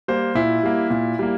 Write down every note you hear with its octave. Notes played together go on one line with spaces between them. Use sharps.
G3 A#3 C5
A#2 E4
G3 A#3
A#2
G3 A#3